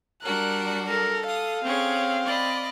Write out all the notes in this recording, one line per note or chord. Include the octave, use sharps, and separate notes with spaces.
G3 D4 F#4 A#4 F#6
A4 A#4
F5 D#6
C4 C#4 G#4 C#5
D5 D#5 B5